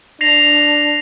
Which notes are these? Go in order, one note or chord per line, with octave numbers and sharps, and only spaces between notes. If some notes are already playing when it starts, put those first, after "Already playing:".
D4 A#6 C7 F7